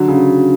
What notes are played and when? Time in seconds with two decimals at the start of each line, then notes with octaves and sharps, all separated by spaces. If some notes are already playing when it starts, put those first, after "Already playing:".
Already playing: D3 F#3
0.08 C#3